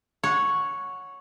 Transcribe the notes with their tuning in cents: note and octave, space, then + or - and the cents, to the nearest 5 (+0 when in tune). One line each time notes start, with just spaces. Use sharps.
C#5 +0 F#5 -20